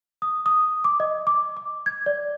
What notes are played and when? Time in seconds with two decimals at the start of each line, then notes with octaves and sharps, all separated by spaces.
0.22 D#6
0.46 D#6
0.84 D6
1.00 D#5
1.27 D6
1.57 D6
1.86 G#6
2.06 D5